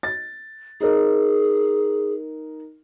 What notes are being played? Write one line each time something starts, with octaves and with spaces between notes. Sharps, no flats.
A6
D#4 G#4 A#4